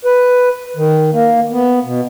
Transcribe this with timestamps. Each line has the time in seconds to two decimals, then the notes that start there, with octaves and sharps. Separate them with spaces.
0.05 B4
0.77 D#3
1.13 A#3
1.52 B3
1.85 B2